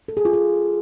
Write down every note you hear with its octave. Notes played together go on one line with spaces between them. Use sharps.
A4
G#4
F4
G#4